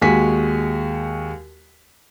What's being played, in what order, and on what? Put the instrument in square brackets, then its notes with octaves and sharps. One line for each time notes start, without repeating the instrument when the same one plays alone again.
[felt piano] D#2 G#3 F#4 G#5 B6